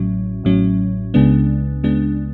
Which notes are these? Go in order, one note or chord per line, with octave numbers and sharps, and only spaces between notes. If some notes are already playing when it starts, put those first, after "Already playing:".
Already playing: A1 A2 F#3 C#4
A1 A2 F#3 C#4
C#2 C#3 G#3 B3 D4
C#2 C#3 G#3 B3 D4